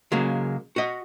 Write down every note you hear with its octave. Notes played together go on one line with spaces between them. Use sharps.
C#3 F#3 G#3 A#3
F#4 D#5